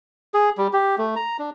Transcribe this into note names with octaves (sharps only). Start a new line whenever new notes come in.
G#4
G3
G4
A3
A#5
D4